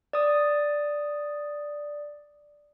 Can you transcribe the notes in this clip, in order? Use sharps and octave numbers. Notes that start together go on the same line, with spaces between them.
D5 D#6